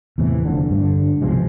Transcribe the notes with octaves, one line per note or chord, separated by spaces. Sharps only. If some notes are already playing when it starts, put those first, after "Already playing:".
E2 A2 C3 E3
F1 D3 F3
G2 D3
C2 B2 F3 G#3